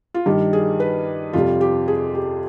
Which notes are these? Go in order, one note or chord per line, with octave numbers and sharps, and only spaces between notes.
F4
G2 D#3 G3 G4
G#4
B4
F2 C3 G3 F4
G4
G#4
G4